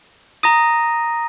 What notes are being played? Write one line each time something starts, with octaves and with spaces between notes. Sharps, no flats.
A#5 D#6 A#6 D#7